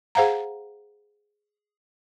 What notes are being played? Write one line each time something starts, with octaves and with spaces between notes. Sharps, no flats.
G#4 C5 F5 F#5 A#5